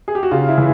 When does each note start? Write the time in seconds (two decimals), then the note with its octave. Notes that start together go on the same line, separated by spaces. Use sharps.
0.08 G#4
0.15 G4
0.23 F#4
0.31 C#3 F4
0.49 E4
0.58 E3